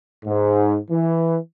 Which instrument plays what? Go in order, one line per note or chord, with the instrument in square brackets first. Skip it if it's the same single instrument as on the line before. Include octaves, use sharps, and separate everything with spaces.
[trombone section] G#2
E3